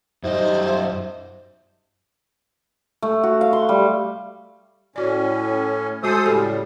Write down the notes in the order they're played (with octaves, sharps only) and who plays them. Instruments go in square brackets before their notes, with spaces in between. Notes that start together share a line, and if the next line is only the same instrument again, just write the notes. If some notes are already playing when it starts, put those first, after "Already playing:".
[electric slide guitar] F#2 D#5 [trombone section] G3 D#4 [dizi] C5 [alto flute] E5
[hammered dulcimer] A3
F#4
F5
C6
G3
[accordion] A2 C#4 [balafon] F#4 D5
[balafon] G#3 F#4 G#5 [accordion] A4 C5 D#6
[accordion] A2 C#3 G3 [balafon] G4 A4 G#5